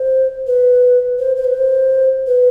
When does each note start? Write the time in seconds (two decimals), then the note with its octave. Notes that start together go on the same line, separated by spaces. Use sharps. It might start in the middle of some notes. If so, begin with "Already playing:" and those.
Already playing: C5
0.47 B4
1.19 C5
1.36 C5
1.45 B4
1.53 C5
2.27 B4